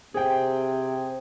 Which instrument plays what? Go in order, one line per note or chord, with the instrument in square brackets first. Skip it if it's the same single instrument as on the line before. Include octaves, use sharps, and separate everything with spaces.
[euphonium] C3 [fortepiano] G#4 G5 [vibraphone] C5